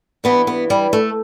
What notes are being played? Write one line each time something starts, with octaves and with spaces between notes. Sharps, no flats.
G2 E3 B3
B3
G3
A3